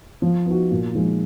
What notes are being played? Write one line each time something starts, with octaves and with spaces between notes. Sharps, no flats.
F3
B3 D#4 F#4
A#2
F3 G#3 D#4